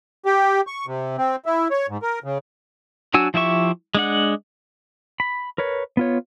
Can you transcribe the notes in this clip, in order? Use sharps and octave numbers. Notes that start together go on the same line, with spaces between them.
G4
C#6
C3
C4
E4
C#5
G#2
A#4
C#3
F#3 D4 F#4 G#5 E6
F3 E4 G4 E5 C#6
G#3 D4 F#5
B5
A#4 B4 C#5
B3 F4 C#5